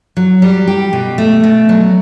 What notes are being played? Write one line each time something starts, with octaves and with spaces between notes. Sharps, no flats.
F#3
G3
G4
B2
A3
B2
F#3